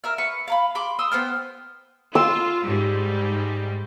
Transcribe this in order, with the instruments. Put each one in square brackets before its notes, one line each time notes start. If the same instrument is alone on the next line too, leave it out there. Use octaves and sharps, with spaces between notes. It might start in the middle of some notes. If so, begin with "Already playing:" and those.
[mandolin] A#4 E5 F6
B4 C#6
F5 A#5 B5
B5 C6 D6
C6 D#6 E6
B3 C5 G5 F6
[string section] F4 [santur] E6
[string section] G#2 G3